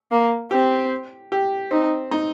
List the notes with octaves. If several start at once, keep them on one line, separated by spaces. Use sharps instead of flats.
A#3
C4 G4
G4
C4 D#4
D#4